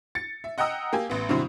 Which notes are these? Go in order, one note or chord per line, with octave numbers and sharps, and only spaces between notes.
A6 C#7
E5
D#5 F#5 G5 A#5 D#6 E6
A#3 G4 G#5
A1 B3
G2 B2 D3 F#3 C4 E4